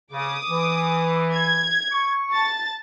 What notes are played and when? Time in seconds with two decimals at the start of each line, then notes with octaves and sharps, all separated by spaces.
0.12 C#3 D6 D#6
0.50 E3
1.32 G#6
1.92 C#6
2.32 A5 A6